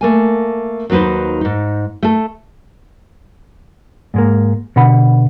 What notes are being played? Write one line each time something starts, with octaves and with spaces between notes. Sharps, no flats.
A3 A#3 G#5
D#2 F#3 D#4 B4 C5
G#2 D#4
A3 A4
G#2 G#3 A#3
B2 D3 F#5 B5